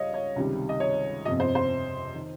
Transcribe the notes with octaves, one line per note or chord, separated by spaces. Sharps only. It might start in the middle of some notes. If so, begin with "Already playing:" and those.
Already playing: C#2 C#3 G3 C#5 D#5 F5
C#5
C#2 C3 D#3 G3
D#5
C#5
G1 F2 C3 F3 D#5
C5
C5
D#3